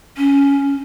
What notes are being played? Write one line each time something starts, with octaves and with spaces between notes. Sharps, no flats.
C#4